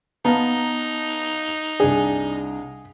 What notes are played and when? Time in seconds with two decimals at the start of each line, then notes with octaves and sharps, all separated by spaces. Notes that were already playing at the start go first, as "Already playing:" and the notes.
0.25 B3 D#4 F5 A5 A#5
1.80 C2 D4 G#4